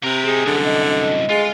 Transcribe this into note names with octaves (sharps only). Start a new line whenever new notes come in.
C3 A#4 B4
C4 D#4 G#4
C2 F#2 D3
D#5
D#5
G#3 F4